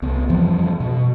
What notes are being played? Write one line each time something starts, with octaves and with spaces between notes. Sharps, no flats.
C2 B3
F2 E3 F3 G3
B2